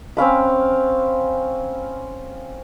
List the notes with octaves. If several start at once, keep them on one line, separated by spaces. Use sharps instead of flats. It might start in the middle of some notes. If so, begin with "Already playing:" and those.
C4 C#4 F5 B5